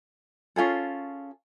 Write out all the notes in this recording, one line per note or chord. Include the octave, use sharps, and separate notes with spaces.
C#4 F4 G#4 A4